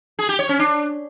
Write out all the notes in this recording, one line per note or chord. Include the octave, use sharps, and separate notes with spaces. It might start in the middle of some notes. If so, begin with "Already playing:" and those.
G#4
G4
C#5
C#4
D4